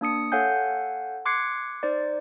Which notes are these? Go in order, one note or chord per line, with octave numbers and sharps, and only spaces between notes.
A#3 D4 D#6 C#7
A4 C#5 F5 F#5 G#5 G6
C6 D6 F#6 G#6 C7 C#7
D#4 C5 D5